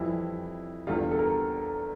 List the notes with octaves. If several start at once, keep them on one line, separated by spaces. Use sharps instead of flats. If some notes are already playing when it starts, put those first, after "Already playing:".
Already playing: F2 E3 G3 E4
E2 D3 G3 F4
A4
A#4